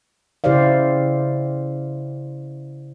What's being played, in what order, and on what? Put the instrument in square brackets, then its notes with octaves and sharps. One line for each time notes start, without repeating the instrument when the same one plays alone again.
[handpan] C#3 E4 G4 C5 D5 F5